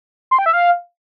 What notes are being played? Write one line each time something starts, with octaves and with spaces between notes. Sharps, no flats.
C6
G5
E5
F5